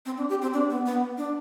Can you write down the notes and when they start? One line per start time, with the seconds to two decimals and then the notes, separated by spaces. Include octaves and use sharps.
0.06 C4
0.18 D4
0.29 G4
0.42 C4
0.53 D4
0.70 B3
0.86 B3
1.17 D4